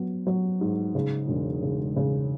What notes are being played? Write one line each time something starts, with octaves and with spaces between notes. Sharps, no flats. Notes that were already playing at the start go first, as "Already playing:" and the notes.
Already playing: F#3 B3
F#3
G#2
C#3
E1
C#3
C#3